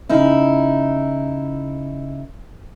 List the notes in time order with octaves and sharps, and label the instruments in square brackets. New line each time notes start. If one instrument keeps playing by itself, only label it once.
[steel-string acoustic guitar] C#3 D#4 E4